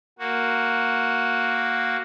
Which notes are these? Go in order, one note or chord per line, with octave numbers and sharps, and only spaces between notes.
A#3 F#4